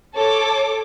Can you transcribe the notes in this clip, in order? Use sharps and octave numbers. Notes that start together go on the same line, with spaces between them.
A4 C#5 D6